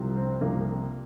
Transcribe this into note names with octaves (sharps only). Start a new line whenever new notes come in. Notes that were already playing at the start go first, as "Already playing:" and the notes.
Already playing: C2 C3 F3
C4
C2 C3 F3 A#3